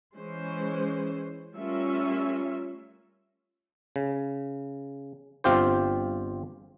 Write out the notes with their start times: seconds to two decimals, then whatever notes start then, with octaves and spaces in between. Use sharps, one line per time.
0.16 E3 G#3 C#4 C5
1.54 G3 A3 C#4 F4 A#4 E5
3.96 C#3
5.44 G1 C4 F4 G4 C5